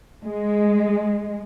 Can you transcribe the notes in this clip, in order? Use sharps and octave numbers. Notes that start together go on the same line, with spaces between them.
G#3